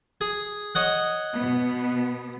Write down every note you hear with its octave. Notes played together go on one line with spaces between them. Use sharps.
G#4
C#5 D#5 F#5
B2 B3